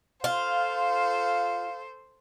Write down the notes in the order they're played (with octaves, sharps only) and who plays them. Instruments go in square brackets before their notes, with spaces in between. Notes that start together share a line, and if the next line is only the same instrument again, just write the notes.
[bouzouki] F4 [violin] A4 C5 [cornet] F5